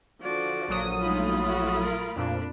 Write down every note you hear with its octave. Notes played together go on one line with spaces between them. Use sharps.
D3 F3 F#4 D5
A#1 F#3 D#6
G#3 A3 D#4 F4 B5
F#4
A#4
F2 A#2 D4